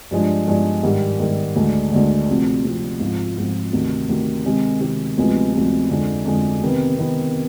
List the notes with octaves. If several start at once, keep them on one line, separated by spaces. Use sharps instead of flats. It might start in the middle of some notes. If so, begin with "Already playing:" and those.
G2 F3 G#3 D4
G2 F3 G#3 D4
G#2 D#3 G3
G#2 D#3 G3
D2 D3 G#3
D2 D3 G#3
D2 C3 F3 C4
D2 C3 F3 C4
G#2 F3 C4 F4
G#2 F3 C4 F4
D2 C3 D#3
D2 C3 D#3
C3 D#3 G#3 C4 G4
C3 D#3 G#3 C4 G4
D2 C3 F3 G#3 B3
D2 C3 F3 G#3 B3
F2 D3 G#3
F2 D3 G#3
C3 D#3 B3
C3 D#3 B3